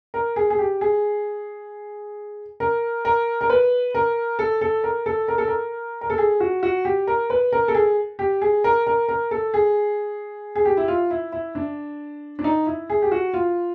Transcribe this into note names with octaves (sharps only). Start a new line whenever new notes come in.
A#4
G#4
G#4
G4
G#4
A#4
A#4
A#4
B4
A#4
A4
A4
A#4
A4
A#4
A4
A#4
A#4
A4
G#4
F#4
F#4
G4
A#4
B4
A#4
A4
G#4
G4
G#4
A#4
A#4
A#4
A4
G#4
G#4
G4
E4
F4
E4
E4
D4
D4
D#4
E4
G#4
G4
F#4
F4